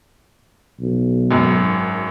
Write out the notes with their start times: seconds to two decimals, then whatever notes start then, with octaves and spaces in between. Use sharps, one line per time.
0.80 B1
1.31 G#1 F#2